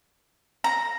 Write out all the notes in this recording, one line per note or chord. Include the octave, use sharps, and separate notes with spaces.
A#5